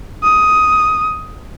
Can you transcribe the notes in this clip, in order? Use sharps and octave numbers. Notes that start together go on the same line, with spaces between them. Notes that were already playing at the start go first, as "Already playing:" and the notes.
D#6